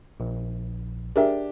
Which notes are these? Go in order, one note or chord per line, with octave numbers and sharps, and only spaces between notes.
A#1
D4 G4 G#4 A#4 E5